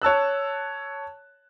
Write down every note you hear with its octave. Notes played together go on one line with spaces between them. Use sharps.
C#5 A5 E6 F#6